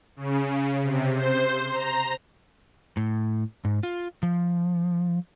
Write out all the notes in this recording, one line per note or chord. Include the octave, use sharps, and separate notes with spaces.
C#3
C3
C5
A#5
A2
G#2
F4
F3